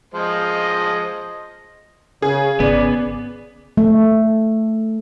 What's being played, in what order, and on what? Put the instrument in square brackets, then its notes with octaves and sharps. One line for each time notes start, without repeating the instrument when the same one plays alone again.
[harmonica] F3 G#3 C5 [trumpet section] D#5
[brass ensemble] C#3 [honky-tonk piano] G#4
[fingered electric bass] G#1 C#3 [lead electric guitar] B3 [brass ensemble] D5
[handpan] A3